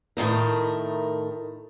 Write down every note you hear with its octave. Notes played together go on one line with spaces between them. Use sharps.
A2 D#3 A3 A#4